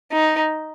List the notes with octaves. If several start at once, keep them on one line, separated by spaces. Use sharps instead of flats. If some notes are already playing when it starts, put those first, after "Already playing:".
D#4